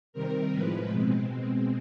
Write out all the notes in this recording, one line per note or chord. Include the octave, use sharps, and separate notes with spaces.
C3 D#3 G3 C4 A#4
A2 F3 G#3 B4
B2 G#3 C4